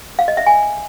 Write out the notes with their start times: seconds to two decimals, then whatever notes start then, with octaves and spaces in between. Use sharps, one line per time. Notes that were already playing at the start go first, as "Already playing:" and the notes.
0.19 F5
0.28 D#5
0.37 E5
0.47 G#5